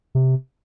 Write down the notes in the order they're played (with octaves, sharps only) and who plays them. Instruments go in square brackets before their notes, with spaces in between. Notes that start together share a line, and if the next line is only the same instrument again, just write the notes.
[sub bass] C3